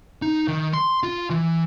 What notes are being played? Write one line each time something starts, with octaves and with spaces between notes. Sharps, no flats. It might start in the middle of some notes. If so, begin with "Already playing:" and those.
D#4
D#3
C6
F4
E3